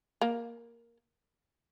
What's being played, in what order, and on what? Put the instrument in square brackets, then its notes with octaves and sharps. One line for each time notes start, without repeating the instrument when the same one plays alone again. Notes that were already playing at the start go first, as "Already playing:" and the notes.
[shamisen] A#3